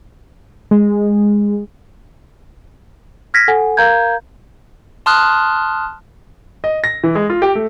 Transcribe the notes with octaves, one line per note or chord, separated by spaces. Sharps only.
G#3
F6 G#6 A#6 B6
A4 F#5 G#5
A#4 F5 A#5 G6 G#6
A5 C6 D#6 F6 F#6
D#5
A#6
E3
G#3
F4
G4
A3